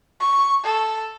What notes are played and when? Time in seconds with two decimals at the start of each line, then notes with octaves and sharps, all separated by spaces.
0.20 C#6
0.64 A4